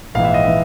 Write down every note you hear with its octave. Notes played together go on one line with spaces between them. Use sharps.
A#1 G#2 E3 F5
E5
D#5
E3 E5